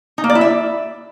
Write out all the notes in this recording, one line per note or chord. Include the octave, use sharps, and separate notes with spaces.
D#4
A#3
D5
E4
E5